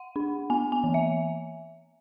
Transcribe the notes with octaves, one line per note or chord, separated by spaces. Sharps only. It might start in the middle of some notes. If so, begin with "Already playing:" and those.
Already playing: F#5
D4
B3 G#5
G#5
E3
E5